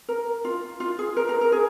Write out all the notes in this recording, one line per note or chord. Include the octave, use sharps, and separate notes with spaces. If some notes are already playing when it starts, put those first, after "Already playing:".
A#4
F4
F4
G#4
A#4
A#4
A#4
G#4